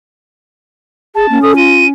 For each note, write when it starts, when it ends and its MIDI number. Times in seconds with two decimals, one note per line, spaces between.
1.15 1.26 68
1.15 1.42 81
1.30 1.41 58
1.30 1.93 61
1.42 1.54 69
1.42 1.52 87
1.57 1.85 65
1.57 1.86 99